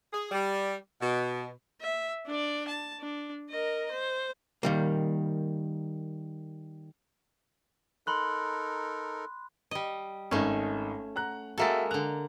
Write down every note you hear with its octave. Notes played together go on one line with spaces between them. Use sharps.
G#4
G3
B2
E5
D4 D5
A5
D4
A#4 D#5
C5
D#3 G3 A#3
D#4 A4 A#4 B5 C6 F#6
G3 D#5
G#1 A3 C#4 D#4
F#5 A#5 F#6
G#3 A#3 F#4 A4 E5 A6
D3 A#5 F#6